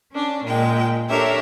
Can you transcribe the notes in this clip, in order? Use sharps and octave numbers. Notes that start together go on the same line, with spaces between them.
C#4 D4
A#2 G#3 G5
D4 G4 A4 A#4 C#5 E5